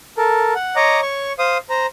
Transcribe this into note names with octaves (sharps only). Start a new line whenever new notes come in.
A4 A#4
F#5
C#5 D#5 A#5 D6
C#5 C#6
C5 F5 D#6
C5 A#5